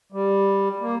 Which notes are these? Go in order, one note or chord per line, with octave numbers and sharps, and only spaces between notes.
G3
A#3